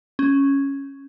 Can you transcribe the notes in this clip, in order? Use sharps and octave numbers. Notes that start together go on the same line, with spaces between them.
C#4